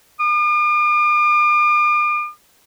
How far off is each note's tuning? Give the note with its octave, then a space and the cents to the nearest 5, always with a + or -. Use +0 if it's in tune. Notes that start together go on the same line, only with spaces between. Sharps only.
D6 +45